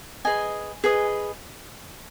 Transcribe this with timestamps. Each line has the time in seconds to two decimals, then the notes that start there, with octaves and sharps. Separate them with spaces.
0.25 G#4 B4 D#5 G#5
0.84 G#4 B4 D#5